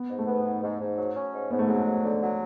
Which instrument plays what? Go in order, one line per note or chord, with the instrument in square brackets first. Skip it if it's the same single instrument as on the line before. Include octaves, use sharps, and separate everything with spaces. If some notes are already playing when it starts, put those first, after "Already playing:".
Already playing: [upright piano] B3
[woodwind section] G#2
[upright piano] A3
[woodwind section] B3
G#2
G#2
G#2
F#3
C#4
G#2
[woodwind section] G#2 [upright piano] B3
[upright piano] A3
[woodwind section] F#3 [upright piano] G#3
[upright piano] A3
[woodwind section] G#2
D3
F#3